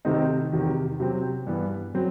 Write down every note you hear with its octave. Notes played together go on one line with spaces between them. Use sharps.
C3 D#3 A3 C4 D#4
E2 C3 D#3
C3 F#3 C4
G2 E3 B3
F#3 C4